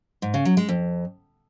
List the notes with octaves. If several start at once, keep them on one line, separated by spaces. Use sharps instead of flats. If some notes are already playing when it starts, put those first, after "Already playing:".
G#2
C#3
F#3
G#3
F2